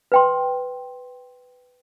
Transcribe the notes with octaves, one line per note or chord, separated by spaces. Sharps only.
B4 G5 C6